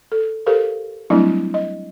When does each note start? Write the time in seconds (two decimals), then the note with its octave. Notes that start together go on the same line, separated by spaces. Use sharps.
0.12 A4
0.46 G4 A4 A#4 C5 F5
1.10 F#3 G3 A3 C4 D4 E4
1.54 D#5